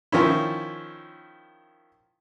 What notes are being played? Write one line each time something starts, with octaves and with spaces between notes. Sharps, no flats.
D#3 F3 C#4 E4